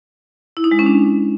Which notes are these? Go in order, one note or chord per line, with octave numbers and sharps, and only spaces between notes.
E4
D#4
G#3
C#4
D4